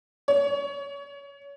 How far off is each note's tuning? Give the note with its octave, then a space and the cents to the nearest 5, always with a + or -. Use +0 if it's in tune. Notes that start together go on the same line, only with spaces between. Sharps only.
C#5 +25